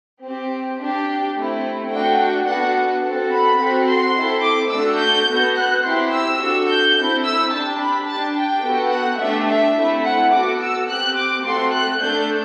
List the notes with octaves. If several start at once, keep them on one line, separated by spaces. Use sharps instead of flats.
C4 G4
D4 G4
A3 C4 E4
A3 D4 F#4 G5
B3 D4 F#4 A4 F#5
C4 F#4 A4
B5
C4 F#4 A4
C6
C4 E4 A4
D6
A3 D4 F#4 A4 E6
G6
B3 F#4 A4
F#6
C4 E4 G4 C6
E6
D4 F#4 A4
G6
C4 E4 A4
E6
D4 G4 A5
B5
D4 G4 A5
G5
B3 F#4 A4
F#5
A3 D4 G4 E5
E5
A3 C4 E4
F#5
B3 F#4 A4 D6
E6
C4 G4 F#6
D6
A3 C4 F#4 A4 C6
F#6
A3 D4 A4 G6